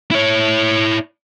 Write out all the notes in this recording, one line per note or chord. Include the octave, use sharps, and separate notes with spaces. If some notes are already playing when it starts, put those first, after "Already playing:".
E4 C#5